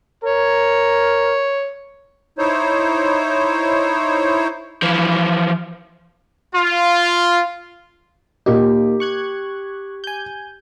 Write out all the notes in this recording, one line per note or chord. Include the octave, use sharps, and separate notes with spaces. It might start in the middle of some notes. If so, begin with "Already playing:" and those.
A#4 C#5
D#4 E4 C5 C#5
E3 F3
F4
A#2 A#3 D#4 G4
C#6 F#6 G#6
G#5 G6